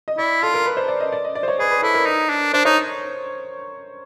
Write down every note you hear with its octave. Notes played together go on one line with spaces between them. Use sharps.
D#5
E4 D5
F4 A4
A#4
B4
C5
D5
D#5
D5
D#5
D5
C5
C#5
G#4 B4
B4
E4 A4
A#4
D#4
D4
D4 C5
D#4 C#5